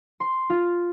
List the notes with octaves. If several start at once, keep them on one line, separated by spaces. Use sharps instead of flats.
C6
F4